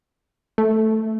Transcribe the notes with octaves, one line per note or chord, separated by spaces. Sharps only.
A3